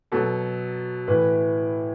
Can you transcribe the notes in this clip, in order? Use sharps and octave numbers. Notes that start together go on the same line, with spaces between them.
B2 F#3 A4
A2 E3 B4